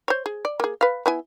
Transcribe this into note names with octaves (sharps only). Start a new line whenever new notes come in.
C5 C#5
G#4
D5
A#3 G#4
B4 F5
B3 E4 G#5